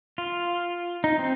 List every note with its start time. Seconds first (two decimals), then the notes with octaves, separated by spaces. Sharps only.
0.18 F4
1.04 D#4
1.19 C4